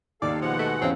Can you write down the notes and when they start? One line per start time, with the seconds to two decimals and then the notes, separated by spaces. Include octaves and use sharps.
0.22 D#2 A4 D5 F5
0.41 B2 F3 G#3 F#5
0.59 A3
0.81 E2 C4 C#4 F5